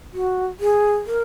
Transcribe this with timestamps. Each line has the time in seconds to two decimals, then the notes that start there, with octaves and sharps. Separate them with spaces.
0.13 F#4
0.60 G#4
1.06 A#4